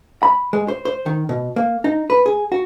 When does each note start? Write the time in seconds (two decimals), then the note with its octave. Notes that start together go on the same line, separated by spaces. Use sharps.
0.23 B5
0.53 G#3
0.68 C5
0.85 C5
1.06 D#3
1.29 B2
1.56 A#3
1.84 D#4
2.10 B4
2.26 G#4
2.52 F#4